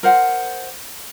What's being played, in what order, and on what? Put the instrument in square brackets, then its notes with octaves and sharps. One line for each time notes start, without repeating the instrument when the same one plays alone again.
[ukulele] A#4 C5 F#5